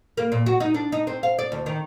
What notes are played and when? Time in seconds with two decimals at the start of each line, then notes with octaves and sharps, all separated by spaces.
0.17 A#3
0.32 A#2
0.46 F#4
0.60 D#4
0.74 D4
0.92 D#4
1.07 C4
1.23 F5
1.39 D5
1.52 D2
1.66 D#3